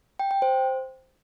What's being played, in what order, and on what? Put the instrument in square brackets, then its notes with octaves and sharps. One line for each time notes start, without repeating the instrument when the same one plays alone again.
[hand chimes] G5
G5
C5